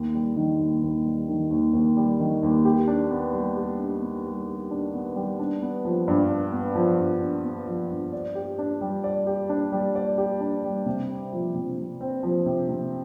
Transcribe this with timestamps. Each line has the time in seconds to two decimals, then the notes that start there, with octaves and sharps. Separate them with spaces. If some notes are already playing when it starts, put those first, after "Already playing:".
Already playing: D#2
0.15 G3
0.36 D#3
0.59 D#2
0.82 D#2
1.06 G3
1.28 D#3
1.51 D#2
1.73 D#2
1.97 G3
2.20 D#3
2.43 D#2
2.65 G4
2.88 D4
3.11 B3
3.33 G3
3.57 G4
3.79 D4
4.02 B3
4.25 G3
4.48 G4
4.71 D4
4.94 B3
5.16 G3
5.39 D4
5.62 B3
5.85 F3
6.08 G2
6.31 D4
6.52 B3
6.75 F3
6.98 G2
7.21 D4
7.45 B3
7.67 F3
7.90 G2
8.13 D5
8.35 G4
8.59 D4
8.81 G3
9.04 D5
9.27 G4
9.49 D4
9.72 G3
9.95 D5
10.18 G4
10.41 D4
10.64 G3
10.86 C3
11.09 C4
11.33 F3
11.55 C3
11.78 C3
12.01 C4
12.23 F3
12.46 C3
12.68 C3